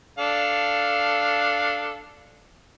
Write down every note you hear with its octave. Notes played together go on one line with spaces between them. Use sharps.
D4 A4 F5